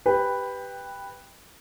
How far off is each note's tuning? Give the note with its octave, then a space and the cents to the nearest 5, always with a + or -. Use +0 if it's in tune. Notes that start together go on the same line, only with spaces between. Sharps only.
G4 +0 B4 +0 G5 +15